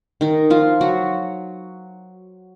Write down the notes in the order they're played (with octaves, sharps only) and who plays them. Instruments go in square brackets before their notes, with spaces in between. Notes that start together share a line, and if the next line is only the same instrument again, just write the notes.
[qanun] D#3 D#4
F3 F4
F#3 F#4